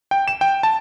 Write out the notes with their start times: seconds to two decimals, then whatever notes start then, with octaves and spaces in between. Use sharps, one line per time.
0.11 G5
0.28 E7
0.41 G5
0.63 A5